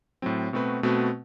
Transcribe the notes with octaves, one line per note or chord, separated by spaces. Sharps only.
A2 F#3 C4
B2 A3 C4 F#4 B4
B2 A3 C4 F#4 B4